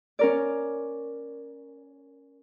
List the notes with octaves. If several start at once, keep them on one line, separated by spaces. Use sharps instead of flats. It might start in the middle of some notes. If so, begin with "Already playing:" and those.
C#4 A#4 D5